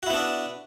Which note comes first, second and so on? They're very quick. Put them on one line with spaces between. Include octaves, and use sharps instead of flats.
F#4 E4 B3 D4